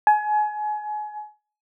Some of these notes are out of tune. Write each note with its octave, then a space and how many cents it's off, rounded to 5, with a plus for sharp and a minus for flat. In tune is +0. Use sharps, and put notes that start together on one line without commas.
G#5 +30